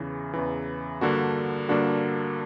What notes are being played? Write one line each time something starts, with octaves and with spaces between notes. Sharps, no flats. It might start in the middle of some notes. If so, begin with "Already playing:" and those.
Already playing: E2 C#3 E3
E2 C#3 E3
G2 D3 A#3 D4 F#4
G2 D3 A#3 D4 F#4